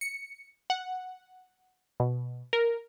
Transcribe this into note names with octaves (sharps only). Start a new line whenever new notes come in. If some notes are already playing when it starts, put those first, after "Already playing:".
C#7
F#5
B2
A#4